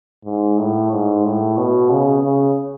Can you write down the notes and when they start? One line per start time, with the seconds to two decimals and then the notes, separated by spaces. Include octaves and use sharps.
0.25 G#2
0.58 A2
0.92 G#2
1.25 A2
1.58 B2
1.90 C#3
2.23 C#3